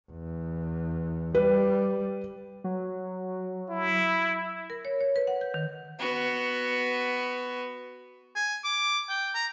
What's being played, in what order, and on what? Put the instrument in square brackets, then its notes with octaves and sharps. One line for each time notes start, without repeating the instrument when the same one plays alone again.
[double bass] E2
[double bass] G3 [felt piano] B4
[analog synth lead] F#3
[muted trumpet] E4
[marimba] A#4
C#5
C#5
B4
F#5
G6
D#3
[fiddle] B3 F#4
[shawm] G#5
D6
G5
A#5